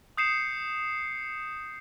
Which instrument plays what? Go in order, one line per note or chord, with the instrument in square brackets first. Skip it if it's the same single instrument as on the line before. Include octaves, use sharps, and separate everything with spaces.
[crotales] D#6 G6 C7 C#7 E7